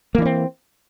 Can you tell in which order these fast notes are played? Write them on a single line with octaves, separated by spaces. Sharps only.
A#3 E3 D4 C4